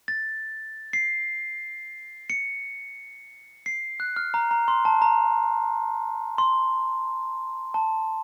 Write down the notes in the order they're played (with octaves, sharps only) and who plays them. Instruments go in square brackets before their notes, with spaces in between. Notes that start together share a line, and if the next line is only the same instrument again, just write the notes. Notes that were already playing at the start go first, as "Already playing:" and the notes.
[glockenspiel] A6
C7
C#7
C7
F#6
F6
A#5
A#5
C6
A5
A#5
C6
A5